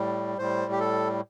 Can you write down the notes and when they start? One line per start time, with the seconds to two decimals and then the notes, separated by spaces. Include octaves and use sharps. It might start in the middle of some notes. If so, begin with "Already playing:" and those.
Already playing: A2 G3
0.38 A2 G3 C5
0.72 G4
0.80 A4